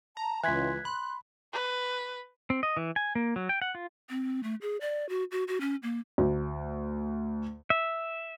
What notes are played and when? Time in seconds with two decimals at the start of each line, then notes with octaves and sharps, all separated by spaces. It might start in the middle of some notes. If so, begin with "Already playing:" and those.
0.17 A5 A#5
0.43 C#2 E3 C6 F#6 G#6 B6
0.85 B5 C6 F#6
1.52 B4
2.50 C4
2.63 D#5
2.77 E3
2.96 G#5
3.15 A#3
3.36 F#3
3.49 G5
3.62 F#5
3.75 F4
4.10 C4
4.43 A3
4.62 G#4
4.81 D5
5.09 F#4
5.32 F#4
5.48 F#4
5.61 C#4
5.83 A#3
6.18 D2
7.70 E5